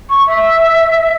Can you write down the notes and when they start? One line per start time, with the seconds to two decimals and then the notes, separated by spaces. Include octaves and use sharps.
0.10 C#6
0.27 E5